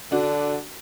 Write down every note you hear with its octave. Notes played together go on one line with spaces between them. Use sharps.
D3 D4 F#4